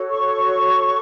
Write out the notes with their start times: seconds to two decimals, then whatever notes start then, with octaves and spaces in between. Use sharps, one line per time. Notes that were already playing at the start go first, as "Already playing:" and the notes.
Already playing: F#4 A4 C#5
0.09 C#6